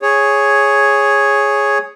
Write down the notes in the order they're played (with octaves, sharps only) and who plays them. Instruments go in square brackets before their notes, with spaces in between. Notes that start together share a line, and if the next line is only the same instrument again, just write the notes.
[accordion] G#4 C#5